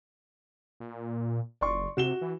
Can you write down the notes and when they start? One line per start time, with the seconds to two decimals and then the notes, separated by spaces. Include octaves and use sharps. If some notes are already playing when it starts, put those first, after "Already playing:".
0.80 A#2
1.61 F#1 D5 C6 C#6
1.97 C3 F#4 E7 G7
2.21 E3